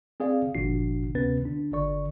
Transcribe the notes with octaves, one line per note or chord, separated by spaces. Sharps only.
C4 G#4 D5 F5
G1 A#2 F3 D4 F#4 C7
D2 C3 B3 C#4 B4 A6
D3 D4
G1 D3 D5 C#6